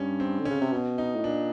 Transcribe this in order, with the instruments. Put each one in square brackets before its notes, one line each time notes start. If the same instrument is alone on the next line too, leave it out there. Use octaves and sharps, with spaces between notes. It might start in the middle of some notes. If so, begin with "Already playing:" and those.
Already playing: [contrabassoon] G2 [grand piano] C#4
[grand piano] C4
[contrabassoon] D3
[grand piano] C#4
[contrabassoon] C#3
C3
B2
[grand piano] D#4
[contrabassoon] A2
[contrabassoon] A#2 [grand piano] D4